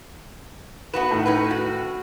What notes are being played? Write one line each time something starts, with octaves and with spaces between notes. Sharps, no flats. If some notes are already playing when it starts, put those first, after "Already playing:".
B3 F#4 B4 F#5 E7
A2 D#3
C#4 D#4 B4
F#4